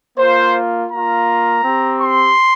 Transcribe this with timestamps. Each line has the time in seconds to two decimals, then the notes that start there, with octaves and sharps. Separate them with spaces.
0.17 A#3 F4 C5
0.90 A#3 A#5
0.96 F4
1.65 C4 G4
2.00 C6